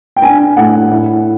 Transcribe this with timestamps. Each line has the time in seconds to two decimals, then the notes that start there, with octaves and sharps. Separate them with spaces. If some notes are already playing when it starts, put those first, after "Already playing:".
0.16 G5
0.22 D4 G#5
0.57 A2 F#5
0.91 E4